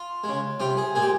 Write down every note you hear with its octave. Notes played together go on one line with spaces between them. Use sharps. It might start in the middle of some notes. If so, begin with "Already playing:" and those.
Already playing: F4
C#3 G#3
C3 G3 F4
G#4
A#2 G#3 G#4
G4